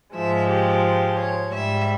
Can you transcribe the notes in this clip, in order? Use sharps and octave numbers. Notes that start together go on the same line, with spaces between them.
G#2 F3 G#3 E5
G4
C#5
G#2 G3 E5